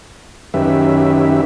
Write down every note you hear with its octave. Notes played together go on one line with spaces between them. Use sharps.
F#2 D#3 C#4 G4 B4 E5